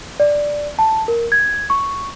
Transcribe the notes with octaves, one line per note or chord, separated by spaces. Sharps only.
D5
A5
A#4
G#6
C#6